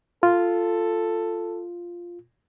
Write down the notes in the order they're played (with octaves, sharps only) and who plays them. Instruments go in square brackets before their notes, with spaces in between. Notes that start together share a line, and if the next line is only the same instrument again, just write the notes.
[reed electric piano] F4 [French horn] A4